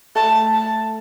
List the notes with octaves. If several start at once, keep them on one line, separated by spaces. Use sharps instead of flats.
A3 A5
A5